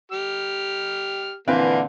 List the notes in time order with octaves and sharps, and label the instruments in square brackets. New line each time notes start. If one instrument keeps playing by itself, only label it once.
[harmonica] G4 F6
[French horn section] A#2 D3 E3 [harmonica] A#3 [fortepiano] C4 B4 F5